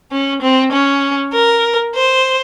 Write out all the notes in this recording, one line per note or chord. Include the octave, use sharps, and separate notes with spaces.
C#4
C4
C#4
A#4
C5